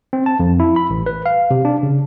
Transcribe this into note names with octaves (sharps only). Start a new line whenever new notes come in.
C4
A5
F2
E4
B5
A1
B4
F5
C3
D4
C#3